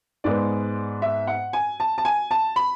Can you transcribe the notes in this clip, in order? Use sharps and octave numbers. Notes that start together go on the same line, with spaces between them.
G#2 G#3 B3 D5
E5
F#5
G#5
A5
A5
G#5
A5
B5